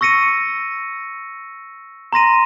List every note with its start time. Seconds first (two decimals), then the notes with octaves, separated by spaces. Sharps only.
0.01 C#6 E6 A#6 C#7 D#7
2.13 A#5 C6 A#6 D#7